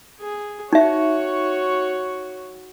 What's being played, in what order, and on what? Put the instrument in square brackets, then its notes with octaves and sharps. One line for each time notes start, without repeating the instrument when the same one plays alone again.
[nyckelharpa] G#4
[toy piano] D#4 E5 [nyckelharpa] F#4 C#5